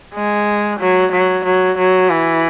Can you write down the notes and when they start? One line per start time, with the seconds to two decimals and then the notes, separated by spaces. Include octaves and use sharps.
0.15 G#3
0.80 F#3
1.12 F#3
1.45 F#3
1.78 F#3
2.10 E3